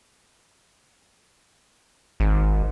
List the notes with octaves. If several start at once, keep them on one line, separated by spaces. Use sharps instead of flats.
G#1